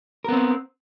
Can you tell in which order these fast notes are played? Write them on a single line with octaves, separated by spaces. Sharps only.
A#4 B3 C4